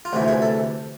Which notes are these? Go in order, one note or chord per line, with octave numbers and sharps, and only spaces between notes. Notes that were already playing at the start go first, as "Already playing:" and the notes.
F4
D2 C3 E3 F#4
G#4
A4